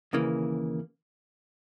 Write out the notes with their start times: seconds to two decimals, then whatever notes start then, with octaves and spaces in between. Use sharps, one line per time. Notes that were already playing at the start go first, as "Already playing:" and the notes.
0.13 D#2 C#3 E3 A#3